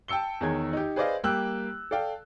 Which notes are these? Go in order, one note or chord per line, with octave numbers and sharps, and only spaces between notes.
G5 A5 E6 C#7 G7
E2 D#3 G#4 C#5 G#6
D#4 G4
G#4 B4 C5 D5 D#5 F5
G3 A#3 G4 G5 E6 F#6
A4 D5 F5 G5